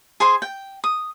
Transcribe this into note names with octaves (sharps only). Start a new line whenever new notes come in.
G#4 C5 G#5 C6
G5
D#6